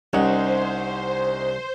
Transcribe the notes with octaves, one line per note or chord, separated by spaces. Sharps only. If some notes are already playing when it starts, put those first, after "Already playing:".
C2 C#4 D#4 C5 F#5